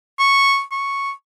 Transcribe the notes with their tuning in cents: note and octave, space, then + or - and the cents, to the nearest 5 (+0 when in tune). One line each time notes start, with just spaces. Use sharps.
C#6 -5
C#6 -5